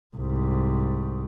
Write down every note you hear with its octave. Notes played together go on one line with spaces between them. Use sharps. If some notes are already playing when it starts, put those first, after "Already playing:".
C2 G#2